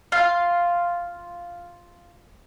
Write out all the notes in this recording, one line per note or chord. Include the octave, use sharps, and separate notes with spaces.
F4 F5